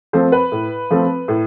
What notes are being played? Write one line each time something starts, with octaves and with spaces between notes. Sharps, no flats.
F3 A3 C4 C5
B4
A2
F3 A3 C4
A2